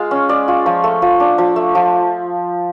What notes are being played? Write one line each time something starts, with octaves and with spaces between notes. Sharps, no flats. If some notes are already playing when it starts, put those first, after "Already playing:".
Already playing: G#3 F4 F5
C#4
G#3 D5
F4
F3 C#5
A3
F3
D4
F3
A3
F3